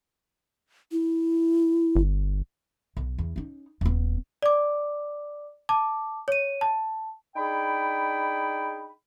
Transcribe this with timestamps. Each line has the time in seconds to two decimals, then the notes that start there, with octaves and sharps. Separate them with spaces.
0.92 E4
1.96 G1
2.97 B1
3.18 E2
3.36 C#4 D#4
3.81 D#1 B3
4.42 D5 D6
5.69 A5 D6
6.28 C#5 D#7
6.61 A5
7.36 D4 D#4 G#4 G5 B5